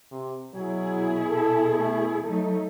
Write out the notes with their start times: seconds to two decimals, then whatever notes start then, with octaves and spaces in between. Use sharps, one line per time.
0.12 C3
0.54 B2 F#3 E4 G#4
1.30 A4
1.79 A3
2.24 F#3 A3 D#4 A4